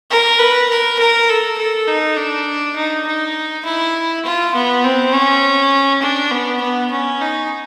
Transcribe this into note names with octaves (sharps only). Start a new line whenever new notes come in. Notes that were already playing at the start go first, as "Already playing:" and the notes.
A#4
B4
A#4
A#4
A4
A4
D#4
D4
D#4
D#4
E4
F4
B3
C4
C#4
D4
B3
B3
C#4
D#4